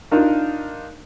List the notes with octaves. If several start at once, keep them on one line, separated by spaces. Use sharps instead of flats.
D4 D#4 F4 A#4